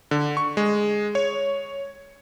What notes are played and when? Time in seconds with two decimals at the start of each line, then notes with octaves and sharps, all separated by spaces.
0.11 D3
0.37 C#6
0.57 G#3
1.15 C#5